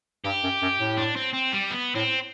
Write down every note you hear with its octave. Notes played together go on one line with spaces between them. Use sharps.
G2 G4
F#2
F#2
A2
D4
C4
C4
G3
B3
A2 C4